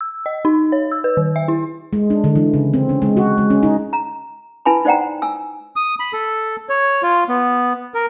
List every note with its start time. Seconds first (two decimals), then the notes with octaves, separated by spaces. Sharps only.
0.01 E6
0.26 D#5
0.45 D#4
0.72 C#5
0.92 E6
1.04 B4
1.17 D#3
1.36 E5
1.48 E4
1.93 G#3
2.10 D4
2.24 D3
2.36 E3
2.54 C#3
2.74 C4
2.89 C#4
3.02 G#3
3.17 F#4
3.38 G#3
3.50 C#4
3.63 D#4
3.93 A#5
4.65 E4 B4 G#5 A5 B5
4.85 D#4 C5 D5 F#5 G5 A#5
5.22 G#5 E6
5.76 D#6
6.00 B5
6.13 A4
6.69 C#5
7.03 F4
7.28 B3
7.94 A#4